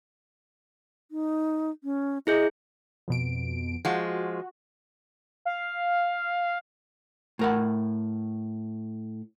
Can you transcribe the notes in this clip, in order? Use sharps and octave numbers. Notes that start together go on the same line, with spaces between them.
D#4
C#4
E4 G#4 D#5 G6
F2 B2 D7
F3 G#3 F#4
F5
A2 A#4 F#5